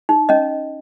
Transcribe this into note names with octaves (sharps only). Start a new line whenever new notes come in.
D#4
C#4 D#5